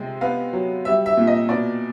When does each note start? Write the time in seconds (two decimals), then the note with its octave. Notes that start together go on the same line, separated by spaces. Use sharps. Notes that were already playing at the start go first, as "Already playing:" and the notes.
Already playing: C3 G#3
0.21 B3 F5
0.53 F#3
0.85 G3 E5
1.06 E5
1.17 A#2
1.27 D#5
1.49 B2 D5